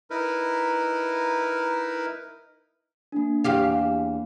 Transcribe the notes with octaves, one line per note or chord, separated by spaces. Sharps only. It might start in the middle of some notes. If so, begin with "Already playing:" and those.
D#4 E4 A#4 B4
A#3 D4
E2 G4 F5